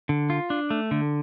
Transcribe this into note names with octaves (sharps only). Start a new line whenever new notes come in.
D3
F4
D4
A3
D3